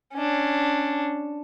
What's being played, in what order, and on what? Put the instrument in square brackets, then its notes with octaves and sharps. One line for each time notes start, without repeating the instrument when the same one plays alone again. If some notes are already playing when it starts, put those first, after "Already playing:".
[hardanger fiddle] C#4 D4